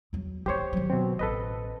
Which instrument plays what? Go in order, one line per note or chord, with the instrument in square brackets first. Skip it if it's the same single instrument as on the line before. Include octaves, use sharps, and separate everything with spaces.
[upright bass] E2 F#3
[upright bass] A3 A#3 [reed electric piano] G4 C5 C#5
[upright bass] D#3 F#3
[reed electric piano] B2 C4
[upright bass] A1 [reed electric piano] A4 B4 D#5